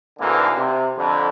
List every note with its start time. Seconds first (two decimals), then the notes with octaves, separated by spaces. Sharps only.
0.20 D2 G#2 B2 D3 E3 A#3
0.56 C3
0.97 F2 D3